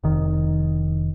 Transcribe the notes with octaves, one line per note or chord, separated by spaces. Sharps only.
F1 D#3